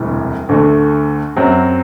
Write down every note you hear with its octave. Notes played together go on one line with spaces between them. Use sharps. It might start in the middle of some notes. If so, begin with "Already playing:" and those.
Already playing: E1 D2 C3 E3 G3
D2 D3 A3
F#2 F#3 C4